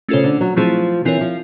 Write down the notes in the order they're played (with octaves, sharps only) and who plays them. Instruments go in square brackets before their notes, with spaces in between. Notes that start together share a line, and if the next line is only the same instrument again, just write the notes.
[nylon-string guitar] C#3 [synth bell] A3 C#4 F4 A4 C5
[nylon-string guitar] D3
F#3
[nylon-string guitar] F3 [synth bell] F#3 A3 C4 E4 G#4
[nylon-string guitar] E3 [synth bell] C4 F4 A#4 C#5
[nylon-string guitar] F3